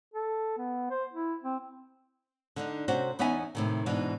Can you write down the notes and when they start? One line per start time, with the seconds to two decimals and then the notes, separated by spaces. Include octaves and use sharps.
0.14 A4
0.57 B3
0.90 C5
1.13 E4
1.44 C4
2.56 D3 D4 D#4
2.88 C3 C#4 F#4 C5
3.19 E2 B3 C#4 D#4 E5 G#5
3.55 A2 C3 D#3
3.86 G#2 B2 E3 D4 D#4